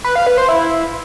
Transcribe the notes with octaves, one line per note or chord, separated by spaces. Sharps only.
B4
F5
B4
C5
E4